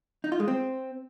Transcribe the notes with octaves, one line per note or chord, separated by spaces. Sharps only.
D#4
F4
G#3
C4